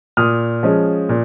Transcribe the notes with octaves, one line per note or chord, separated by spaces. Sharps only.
A#2 D#6 F6
F3 G#3 C#4
A#2